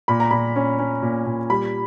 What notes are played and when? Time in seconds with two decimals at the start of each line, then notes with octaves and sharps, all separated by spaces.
0.08 A#2 B5
0.20 A#5
0.31 A#2 B5
0.56 C#4
0.79 C#4
1.02 A#2
1.26 A#2
1.50 G3 B5